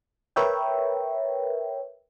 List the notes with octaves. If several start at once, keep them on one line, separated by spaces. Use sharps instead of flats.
A#4 B4 C#5 E5 G5